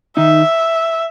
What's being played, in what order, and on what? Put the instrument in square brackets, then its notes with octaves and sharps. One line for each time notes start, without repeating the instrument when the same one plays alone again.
[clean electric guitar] D#3 D#4 [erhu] E5